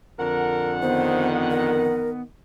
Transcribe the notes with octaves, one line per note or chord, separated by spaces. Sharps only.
F2 D3 A#4 F#5
D#3 B3 C5
A#4